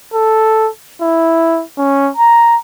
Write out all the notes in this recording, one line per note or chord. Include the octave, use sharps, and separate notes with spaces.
A4
E4
C#4
A#5